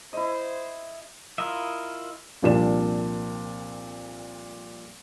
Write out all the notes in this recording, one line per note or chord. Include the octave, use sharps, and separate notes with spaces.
E4 C5 D#5
E4 F4 A#4 D#5 E5
C2 F2 A#2 D4 E7